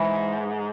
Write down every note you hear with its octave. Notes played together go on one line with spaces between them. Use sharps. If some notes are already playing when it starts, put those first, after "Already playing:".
Already playing: G#2 E3